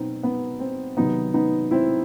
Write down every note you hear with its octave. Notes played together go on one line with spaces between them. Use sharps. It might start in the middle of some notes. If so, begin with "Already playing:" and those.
Already playing: B2 F#3 B3 C4 D#4
B3
C4
C3 D#3 F#3 B3 D#4
B3 D#4
C4 E4